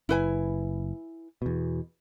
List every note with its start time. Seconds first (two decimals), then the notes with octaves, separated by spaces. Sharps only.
0.09 F#1 E4 B4 G#5
1.42 E2 B2